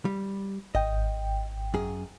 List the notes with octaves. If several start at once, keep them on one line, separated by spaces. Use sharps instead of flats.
G3
G#1 D#5 G5
F#2 G#4